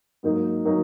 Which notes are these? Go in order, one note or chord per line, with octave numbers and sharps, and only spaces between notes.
G#2 F#3 A#3 D#4
F#3 A#3 D#4